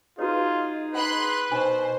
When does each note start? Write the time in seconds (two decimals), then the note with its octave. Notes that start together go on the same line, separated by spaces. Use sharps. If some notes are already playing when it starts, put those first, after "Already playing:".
0.19 D#4 F4 F#4 G#4 B4 C#5
0.95 B4 F#5 B5 C6 F#6
1.52 B2 D#4 C5 G#5